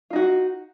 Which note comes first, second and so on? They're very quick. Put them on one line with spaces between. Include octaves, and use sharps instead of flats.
F4 D#4 F#4